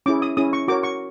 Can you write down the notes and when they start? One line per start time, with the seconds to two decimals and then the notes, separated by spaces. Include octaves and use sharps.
0.06 C#4 E4 G#4 D6
0.22 D#6
0.37 C#4 E4 G#4 D#6
0.53 C#6
0.68 F#4 A#4 C#5 D6
0.83 C#6